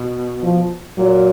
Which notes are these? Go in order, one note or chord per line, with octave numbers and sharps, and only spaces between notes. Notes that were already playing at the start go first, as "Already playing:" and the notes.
Already playing: B2
F3
A#2 F#3